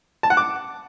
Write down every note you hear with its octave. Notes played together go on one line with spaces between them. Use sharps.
A5
F#5
D6